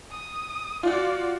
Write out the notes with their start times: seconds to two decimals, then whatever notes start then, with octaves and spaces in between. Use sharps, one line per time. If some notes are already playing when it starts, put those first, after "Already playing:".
0.11 D#6
0.83 F4 F#4 D5